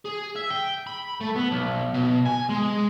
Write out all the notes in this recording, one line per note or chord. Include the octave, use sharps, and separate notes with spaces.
G#4
E5
G5
B5
A3
B3
B1
B2
G#5
G#3